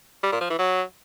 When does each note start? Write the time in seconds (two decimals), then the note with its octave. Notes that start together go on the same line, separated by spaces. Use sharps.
0.23 G3
0.32 A#2
0.41 F3
0.50 E3
0.59 F#3